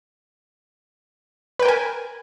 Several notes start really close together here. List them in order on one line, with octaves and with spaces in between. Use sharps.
B4 G5 A#4 G#5